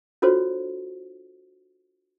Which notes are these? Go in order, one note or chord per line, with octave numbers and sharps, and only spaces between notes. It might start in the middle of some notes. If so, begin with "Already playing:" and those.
D4 F4 F#4 A4 C5 C#5